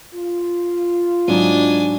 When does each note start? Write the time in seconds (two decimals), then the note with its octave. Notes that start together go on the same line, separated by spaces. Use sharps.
0.14 F4
1.28 G#2 F#3 D4 D#4 G#5